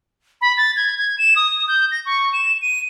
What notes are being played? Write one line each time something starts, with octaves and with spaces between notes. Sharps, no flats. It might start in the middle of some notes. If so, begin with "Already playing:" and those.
B5
A6
G#6
G#6
E7
D#6
G6
A#6
C#6
E7
D#7